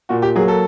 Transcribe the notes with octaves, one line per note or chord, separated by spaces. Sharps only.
A#2 F#4
G4
F#3 A#3 G#4
A4